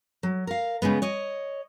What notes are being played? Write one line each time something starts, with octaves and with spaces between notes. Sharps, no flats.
F#3
A#4 F5
C#3 E3 G#3 B3
C#5 D#5